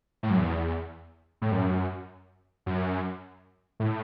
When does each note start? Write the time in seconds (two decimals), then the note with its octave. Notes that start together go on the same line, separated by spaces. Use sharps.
0.23 A2
0.30 F#2
0.39 E2
1.42 A2
1.52 F#2
2.66 F#2
3.80 A2